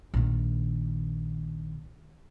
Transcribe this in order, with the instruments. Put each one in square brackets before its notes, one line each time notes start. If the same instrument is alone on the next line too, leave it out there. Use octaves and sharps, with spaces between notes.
[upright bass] A#1 D#3